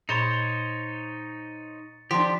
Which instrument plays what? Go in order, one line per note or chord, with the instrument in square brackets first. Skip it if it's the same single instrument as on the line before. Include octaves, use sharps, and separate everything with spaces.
[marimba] A#2 B5 [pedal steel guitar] D#4 C5 C#5 [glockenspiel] A6 C#7
[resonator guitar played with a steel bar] F3 D4 [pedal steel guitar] G4 [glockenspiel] B6